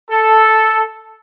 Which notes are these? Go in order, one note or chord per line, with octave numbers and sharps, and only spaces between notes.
A4